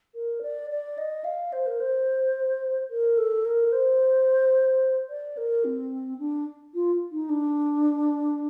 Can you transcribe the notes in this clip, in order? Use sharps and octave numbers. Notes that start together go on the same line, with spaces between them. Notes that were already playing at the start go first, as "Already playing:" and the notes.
A#4
D5
D5
D#5
F5
C5
A#4
C5
A#4
A4
A#4
C5
D5
A#4
C4
D4
F4
D#4
D4